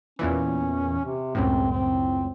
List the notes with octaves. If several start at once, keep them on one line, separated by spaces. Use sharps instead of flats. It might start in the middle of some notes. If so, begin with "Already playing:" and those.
E2 A#2 E3 C#4
C3
C#2 F#2 A2 C4
C4